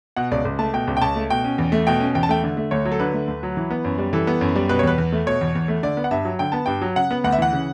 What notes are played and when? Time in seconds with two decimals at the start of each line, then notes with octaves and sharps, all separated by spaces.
0.16 B2 F#5
0.31 C#2 D5
0.45 C#2
0.59 A3 A5
0.73 B2 G5
0.87 C#2
0.97 G5
1.02 C#2 A5
1.16 A3
1.30 B2 G5
1.44 C#4
1.58 E2
1.72 A3
1.87 B2 G5
2.00 C#4
2.15 E2 G5
2.23 A5
2.29 A3 G5
2.43 D3
2.57 A3
2.71 D2 C#5
2.85 F#3
2.92 A4
3.00 D3 B4
3.13 A3
3.28 D2
3.43 F#3
3.57 E3
3.71 B3
3.84 F#2
3.98 G3
4.13 E3 A4
4.27 B3
4.41 F#2
4.56 G3
4.69 B2 B4
4.79 C#5
4.83 E2 B4
4.98 E2
5.12 A3
5.26 B2 C#5
5.41 E2
5.55 E2
5.68 A3
5.83 D3 D5
5.97 B3
6.04 F#5
6.11 G2 E5
6.25 F#3
6.39 D3 G5
6.52 B3 A5
6.66 G2 G5
6.82 F#3
6.96 C#3 F#5
7.11 B3
7.24 D2 F#5
7.32 E5
7.39 E3 F#5
7.53 C#3